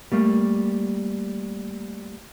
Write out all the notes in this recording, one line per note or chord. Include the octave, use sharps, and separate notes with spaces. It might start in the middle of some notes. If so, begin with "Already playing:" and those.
G3 A3 A#3